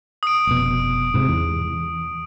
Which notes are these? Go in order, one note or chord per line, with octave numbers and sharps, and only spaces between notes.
D#6 D7
F1 B2
G#2 C3
E2